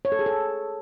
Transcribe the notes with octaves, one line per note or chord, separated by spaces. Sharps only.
C#5
A4
G#4
A4